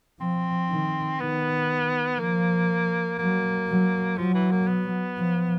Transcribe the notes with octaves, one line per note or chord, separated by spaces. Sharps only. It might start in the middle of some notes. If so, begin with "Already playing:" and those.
F3 C4
D#3
D#3 B3
F3 A#3
F#3 A#3
F#3
F3 F#3
E3
A#3
B3
F3